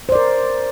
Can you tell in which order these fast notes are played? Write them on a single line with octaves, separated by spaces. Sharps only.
C5 D5 A#4